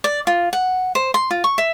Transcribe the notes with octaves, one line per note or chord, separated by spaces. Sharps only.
D5
F4
F#5
C5
C6
F4
C#6
E5